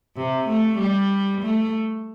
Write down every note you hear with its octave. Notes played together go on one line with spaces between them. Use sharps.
C3
A3
G3
A3